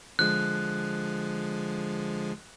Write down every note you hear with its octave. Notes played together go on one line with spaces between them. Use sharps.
D3 F3 G#3 F#6